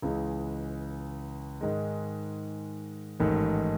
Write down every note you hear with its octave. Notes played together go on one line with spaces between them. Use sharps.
C#2 C#3 E3 G#3
G#2 D#3 G#3
A1 G#2 D#3 A3